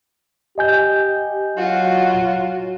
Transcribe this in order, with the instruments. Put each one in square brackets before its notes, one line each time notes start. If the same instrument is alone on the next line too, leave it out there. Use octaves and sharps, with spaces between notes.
[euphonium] G4 [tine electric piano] D#5 G#5 G6
[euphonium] F#3 [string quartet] F4 F#4